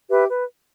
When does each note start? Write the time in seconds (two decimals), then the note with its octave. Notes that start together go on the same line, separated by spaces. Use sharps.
0.09 G4 B4 E5
0.29 B4